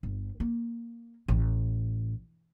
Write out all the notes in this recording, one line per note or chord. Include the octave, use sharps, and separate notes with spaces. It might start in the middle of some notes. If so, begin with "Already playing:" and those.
G1
A#3
A1